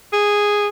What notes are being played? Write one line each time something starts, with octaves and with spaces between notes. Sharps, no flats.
G#4